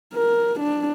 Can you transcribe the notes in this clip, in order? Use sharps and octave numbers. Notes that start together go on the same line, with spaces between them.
A#4
D4